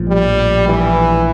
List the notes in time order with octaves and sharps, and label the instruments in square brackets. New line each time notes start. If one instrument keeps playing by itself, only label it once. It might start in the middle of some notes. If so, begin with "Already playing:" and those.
Already playing: [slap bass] A#1 A2 F3
[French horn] G3
E3